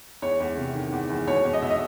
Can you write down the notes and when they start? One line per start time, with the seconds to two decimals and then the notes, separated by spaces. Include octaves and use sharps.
0.22 E2 C#5
0.40 E2
0.57 C3
0.75 D#3
0.92 E2
1.10 E2
1.27 B2 C#5
1.45 E2
1.53 D#5
1.62 B2 E5
1.70 D#5